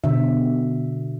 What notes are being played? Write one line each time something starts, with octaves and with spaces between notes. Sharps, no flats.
B2 D3 E5